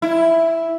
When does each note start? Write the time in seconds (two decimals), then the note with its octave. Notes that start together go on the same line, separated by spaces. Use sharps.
0.02 E4